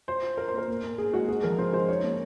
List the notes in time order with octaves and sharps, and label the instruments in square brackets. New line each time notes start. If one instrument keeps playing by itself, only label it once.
[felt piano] F4 [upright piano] C5
[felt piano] F4
[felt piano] F4 [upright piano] A#4
[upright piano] C5
[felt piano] A#3 [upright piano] A#4
[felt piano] A#2
A#2
[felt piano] A#2 [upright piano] G#4
[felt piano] G#3 [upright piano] F#4
[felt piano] G#3 [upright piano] G#4
[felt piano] F3 [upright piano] A#4
[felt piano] C#3 [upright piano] C5
[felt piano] G#3 [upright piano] C5
[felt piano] D#4 [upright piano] C#5
[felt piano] A#3